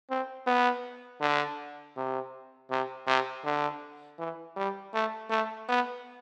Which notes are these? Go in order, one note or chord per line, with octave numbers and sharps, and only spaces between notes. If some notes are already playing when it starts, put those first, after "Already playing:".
C4
B3
D3
C3
C3
C3
D3
E3
G3
A3
A3
B3